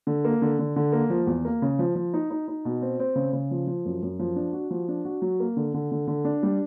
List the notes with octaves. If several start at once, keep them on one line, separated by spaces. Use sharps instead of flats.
D3
A#3
D3
D3
D3
A#3
F3
E2
A#3
C#3
F3
F3
D#4
D#4
D#4
B2
C4
C4
C#3
C#3
F3
F3
F#2
F#2
F3
D4
F#4
F3
D4
F#4
F#3
A#3
D3
D3
D3
D3
D4
G3